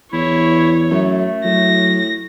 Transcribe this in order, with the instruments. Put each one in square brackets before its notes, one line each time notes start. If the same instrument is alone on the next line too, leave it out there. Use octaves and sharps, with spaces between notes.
[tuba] E2 [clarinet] E4 [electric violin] C#5
[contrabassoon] F#2 [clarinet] A3
[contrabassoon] A2 [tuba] F#3 [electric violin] A#6